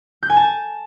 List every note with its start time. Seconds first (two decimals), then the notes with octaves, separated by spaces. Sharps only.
0.23 G6
0.30 G#5
0.37 A5